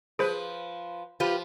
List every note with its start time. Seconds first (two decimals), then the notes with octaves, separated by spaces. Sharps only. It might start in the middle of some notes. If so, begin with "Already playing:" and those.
0.19 F3 G#4 B4 C5
1.20 F3 F4 G4 B4